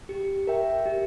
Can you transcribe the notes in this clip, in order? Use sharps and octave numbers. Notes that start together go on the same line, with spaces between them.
G4
A#4 E5 G5
G4